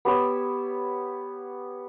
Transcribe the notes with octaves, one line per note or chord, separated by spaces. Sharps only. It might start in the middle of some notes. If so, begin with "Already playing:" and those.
B3 G4 C#5 E6